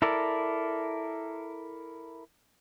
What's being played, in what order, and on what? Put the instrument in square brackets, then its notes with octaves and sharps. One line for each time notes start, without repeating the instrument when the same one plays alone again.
[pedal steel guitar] E4 A4 A#4 D5